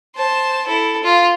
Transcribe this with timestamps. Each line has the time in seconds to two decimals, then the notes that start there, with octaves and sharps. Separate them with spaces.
0.16 C5 A5
0.67 E4 A4
1.03 F4